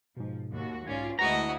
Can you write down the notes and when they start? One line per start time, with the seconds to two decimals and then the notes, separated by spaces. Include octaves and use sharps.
0.17 G#2 B2 F3
0.51 D#2 F#4
0.87 B1 G#2 C#4 F4 D5 G#6
1.19 D2 G#3 E4 F#4 B4 D#5 A#5